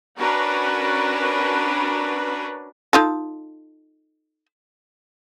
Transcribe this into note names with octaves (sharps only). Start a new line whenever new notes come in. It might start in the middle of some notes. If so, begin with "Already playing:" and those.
C#4 D4 F#4 A#4 B4
D#4 F4 A4